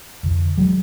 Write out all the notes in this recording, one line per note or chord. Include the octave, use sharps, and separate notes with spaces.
F2 D3
F#3 G#3